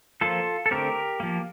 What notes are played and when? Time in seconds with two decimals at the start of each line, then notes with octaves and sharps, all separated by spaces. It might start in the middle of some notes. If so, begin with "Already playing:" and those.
0.21 F3 A#3 F4 A4
0.66 A4
0.71 D3 A3 C4 G4 A#4
1.20 F3 A#3